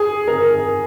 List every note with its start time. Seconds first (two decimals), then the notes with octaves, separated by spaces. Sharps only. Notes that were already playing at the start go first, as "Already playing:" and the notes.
Already playing: G#4
0.28 A#4